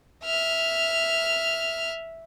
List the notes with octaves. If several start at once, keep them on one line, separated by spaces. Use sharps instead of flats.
E5 F6